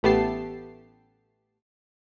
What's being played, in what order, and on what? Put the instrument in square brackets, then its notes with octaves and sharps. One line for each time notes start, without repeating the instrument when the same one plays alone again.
[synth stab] A1 A3 B3 G4 A5 C7